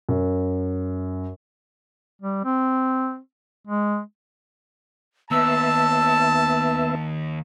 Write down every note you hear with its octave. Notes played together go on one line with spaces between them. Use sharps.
F#2
G3
C4
G#3
D#2 B3 E5 A5 E6